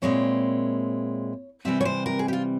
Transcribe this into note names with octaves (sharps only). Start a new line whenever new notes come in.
A#2 G#3 C4 E4 C#5
C3 E3 G3 C4 E5
C#5
C5
A#4
G#4
G4
F4